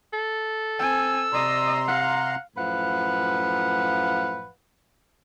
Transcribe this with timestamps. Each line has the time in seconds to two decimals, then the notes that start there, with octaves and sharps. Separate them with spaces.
0.13 A4
0.79 C4 G#5 E6
1.33 C3 D5 D#5 A#5 C6
1.88 F5 F#5
2.57 F#2 A2 F3 B4 F5 F#5